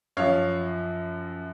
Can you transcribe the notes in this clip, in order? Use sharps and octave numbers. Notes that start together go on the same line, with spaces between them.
F#2 F3 C#5 F5